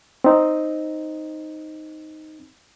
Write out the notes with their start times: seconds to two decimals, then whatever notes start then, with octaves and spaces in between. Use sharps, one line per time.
0.24 C4 D#4